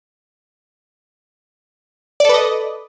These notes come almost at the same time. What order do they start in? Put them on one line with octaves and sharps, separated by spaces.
D5 A4 B4 D#5